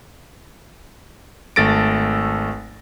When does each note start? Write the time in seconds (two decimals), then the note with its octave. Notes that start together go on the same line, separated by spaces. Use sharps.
1.56 G#1 A3 A4 A6 A#6 D7